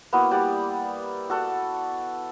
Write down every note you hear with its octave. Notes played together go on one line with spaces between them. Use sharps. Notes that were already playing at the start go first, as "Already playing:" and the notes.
A#3 B3 E4 F#4
G3 G4 D5 F#5
F#4 A4 F#5